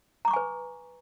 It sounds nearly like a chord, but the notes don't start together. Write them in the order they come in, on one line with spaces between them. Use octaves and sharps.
A#5 D6 C#6 G#5 B4